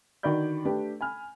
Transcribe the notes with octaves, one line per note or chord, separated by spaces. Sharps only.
D3 D#3 F#4 D5 B5 G6
A3 D4 G4 B4
G#5 B5 F6